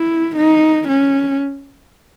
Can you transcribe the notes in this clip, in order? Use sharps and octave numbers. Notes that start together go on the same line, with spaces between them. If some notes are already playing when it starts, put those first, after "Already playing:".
Already playing: E4
D#4
C#4